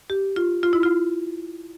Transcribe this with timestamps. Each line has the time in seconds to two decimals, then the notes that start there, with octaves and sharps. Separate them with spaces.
0.10 G4
0.36 F4
0.63 F4
0.73 E4
0.83 F4